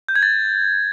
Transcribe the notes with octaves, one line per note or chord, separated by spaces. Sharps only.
G6
G#6
A6